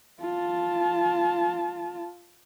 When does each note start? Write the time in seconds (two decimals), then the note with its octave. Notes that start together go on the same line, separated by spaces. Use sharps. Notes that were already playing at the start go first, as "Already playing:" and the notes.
0.21 F4 A5